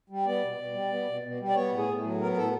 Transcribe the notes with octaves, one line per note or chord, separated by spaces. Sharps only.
G3
B3 D5
B2
B2
G3
B3
B2
B2
G3
D5
B3 C#5
A2
G#4
A2
F#3
B3 A#4
A#4
A2 A4